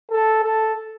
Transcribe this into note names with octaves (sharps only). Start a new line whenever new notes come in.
A4
A4